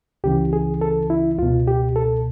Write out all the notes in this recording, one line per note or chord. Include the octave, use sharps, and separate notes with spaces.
C#2 C#3 E3 G4
G#4
A4
E4
C#2 B2 F4
G4
A4